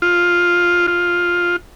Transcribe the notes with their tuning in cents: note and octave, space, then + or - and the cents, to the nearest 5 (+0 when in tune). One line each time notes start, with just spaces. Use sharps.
F4 +5
F4 +5